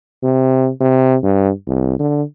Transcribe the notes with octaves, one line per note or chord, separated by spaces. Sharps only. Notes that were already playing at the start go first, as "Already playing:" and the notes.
C3
C3
G2
C2
D3